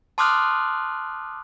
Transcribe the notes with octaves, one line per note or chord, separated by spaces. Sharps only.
A5 C6 D6 D#6 F6 F#6